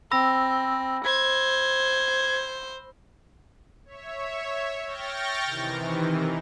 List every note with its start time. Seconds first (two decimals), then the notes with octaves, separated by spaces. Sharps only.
0.11 C4 B5 E6 A#6
1.04 C5 G#6
3.85 C#5 E5
4.86 G5 C#6 F6 G6 A6 A#6
5.45 C3 D#3 E3